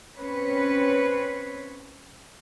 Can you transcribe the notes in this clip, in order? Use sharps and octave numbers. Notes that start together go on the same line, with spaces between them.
C4 C#4 B4 C#5